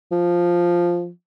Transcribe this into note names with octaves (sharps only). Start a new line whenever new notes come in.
F3